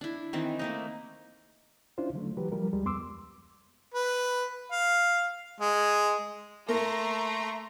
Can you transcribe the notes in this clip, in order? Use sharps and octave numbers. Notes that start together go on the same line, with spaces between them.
D4 E4
D#3 E3 C4
A3 A#3 D#4
C#4 D4 E4 F4 C5
D3 F#3 A3
E3 F#3 G4 B4
F3 G3 A#4
D2 G3 G#3
F2 B3 C6 D6 E6
B4
F5
G#3
A3 A#3 A#5 C6